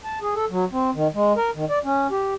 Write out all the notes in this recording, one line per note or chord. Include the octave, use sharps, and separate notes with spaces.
A5
G#4
A4
F#3
C4
D#3
G#3
A#4
D#3
D5
C#4
G4